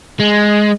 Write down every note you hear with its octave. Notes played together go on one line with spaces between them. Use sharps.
G#3